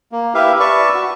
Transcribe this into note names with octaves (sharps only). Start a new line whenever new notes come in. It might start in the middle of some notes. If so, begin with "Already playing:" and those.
A#3
E4 G4 B4 E5 F5
B4 D5 E5 A5 C#6
F#4